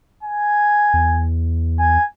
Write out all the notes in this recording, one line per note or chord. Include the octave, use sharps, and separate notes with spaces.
G#5
E2
G#5